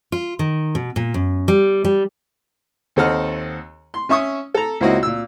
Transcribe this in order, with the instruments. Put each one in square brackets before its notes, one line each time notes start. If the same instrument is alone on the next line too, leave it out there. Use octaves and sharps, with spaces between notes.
[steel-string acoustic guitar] F4
D#3
B2
A#2
F#2
G3
G3
[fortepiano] D#2 C4 A4 D#5 F#5 F6
C6
C#4 E5 C#6 D#6
A4 A#5
C#2 A#3 C4 E4 F#4 D#5
A#2 E6